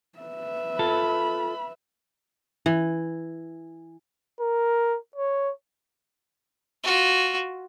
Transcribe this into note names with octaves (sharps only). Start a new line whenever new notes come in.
B4 E5
F4 A4 A5 B5
E3
A#4
C#5
F4 F#4